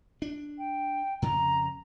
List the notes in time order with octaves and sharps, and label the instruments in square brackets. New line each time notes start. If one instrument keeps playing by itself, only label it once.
[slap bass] D4
[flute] G5
[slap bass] F2 C#3 [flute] A#5